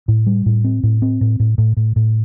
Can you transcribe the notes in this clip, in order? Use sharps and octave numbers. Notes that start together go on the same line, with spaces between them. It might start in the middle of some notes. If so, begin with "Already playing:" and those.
A2
G3
A2
C4
A2
C4
A2
A2
A2
A2
A2